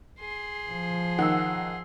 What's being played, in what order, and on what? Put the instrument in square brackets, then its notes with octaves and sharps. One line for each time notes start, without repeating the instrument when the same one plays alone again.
[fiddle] G#4 C6
[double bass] F3
[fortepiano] D#3 [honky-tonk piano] F#5 E6